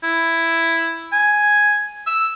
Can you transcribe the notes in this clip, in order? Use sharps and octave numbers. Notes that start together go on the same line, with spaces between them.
E4
G#5
E6